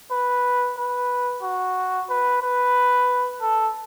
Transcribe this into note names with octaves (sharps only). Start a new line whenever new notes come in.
B4
B4
F#4
B4
B4
A4